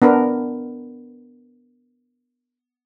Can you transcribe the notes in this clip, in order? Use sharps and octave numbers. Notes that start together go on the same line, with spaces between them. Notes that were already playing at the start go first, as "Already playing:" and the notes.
B3 D4 A#4 B4